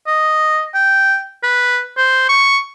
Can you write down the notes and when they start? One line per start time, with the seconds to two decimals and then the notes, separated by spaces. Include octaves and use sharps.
0.07 D#5
0.74 G5
1.43 B4
1.97 C5
2.29 C#6